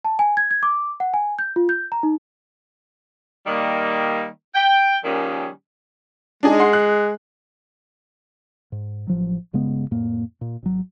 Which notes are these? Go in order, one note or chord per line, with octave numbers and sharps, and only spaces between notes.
A5
G#5
G#6
G#6
D6
F#5
G#5
G6
F4
G6
A#5
D#4
D#3 G3 A#3
G5
A#2 D#3 F3 G3 C#4 G#4
G#3 D4 D#4 G#4
F#5 C6 C7
F#6
G#2
A1 F3 F#3
G1 C#3 G#3 B3
F2 A2 A#3
A#2
G#1 F#3